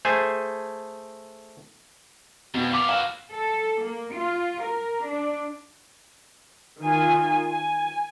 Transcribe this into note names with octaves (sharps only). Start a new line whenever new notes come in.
A3 G#4 C5 G#5
F2 B2
B3 F5 D6
E4 F#4 F5
A4
A#3
F4
A#4
D4
D#3 F4 G#5
G#5